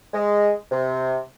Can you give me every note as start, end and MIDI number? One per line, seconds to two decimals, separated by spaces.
0.14 0.52 56
0.71 1.17 48